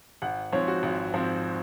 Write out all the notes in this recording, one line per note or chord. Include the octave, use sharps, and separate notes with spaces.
G#1 F#5
G#2 F3 C4 C#5
F#4
G#1
G#2 F3 C4